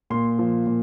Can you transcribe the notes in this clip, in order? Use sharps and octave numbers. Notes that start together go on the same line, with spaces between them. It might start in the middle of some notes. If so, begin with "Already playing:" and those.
A#2 C6
F3
A#2